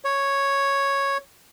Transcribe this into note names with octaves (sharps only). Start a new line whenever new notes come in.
C#5